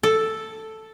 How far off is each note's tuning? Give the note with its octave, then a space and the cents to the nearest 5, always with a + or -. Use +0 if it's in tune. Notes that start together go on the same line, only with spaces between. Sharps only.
A4 +0